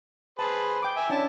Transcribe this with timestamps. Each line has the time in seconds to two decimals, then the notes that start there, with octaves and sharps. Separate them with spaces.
0.39 G#4 B4 C5 A5
0.82 G5 D6
0.97 E5 G#5
1.10 C#4 D4 E4 A5